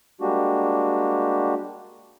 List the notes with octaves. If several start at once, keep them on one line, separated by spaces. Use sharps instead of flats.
G3 G#3 A#3 D4 F#4 G4